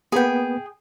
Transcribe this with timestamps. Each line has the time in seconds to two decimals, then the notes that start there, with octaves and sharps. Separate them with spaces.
0.12 A#3 B3 G#4 G5